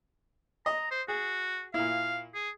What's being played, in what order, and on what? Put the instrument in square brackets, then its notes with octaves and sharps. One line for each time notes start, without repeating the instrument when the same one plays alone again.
[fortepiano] D#5 [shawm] A#5
[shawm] C5
[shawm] F#4 [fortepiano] G#4
[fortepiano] A#2 E4 [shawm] F5
[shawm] G#4